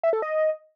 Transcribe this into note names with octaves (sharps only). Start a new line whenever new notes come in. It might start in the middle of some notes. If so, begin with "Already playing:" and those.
E5
A4
D#5